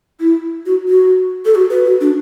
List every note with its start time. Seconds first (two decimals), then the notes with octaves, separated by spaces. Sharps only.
0.20 E4
0.66 F#4
0.88 F#4
1.45 A4
1.55 F#4
1.70 B4
1.85 F#4
2.01 D4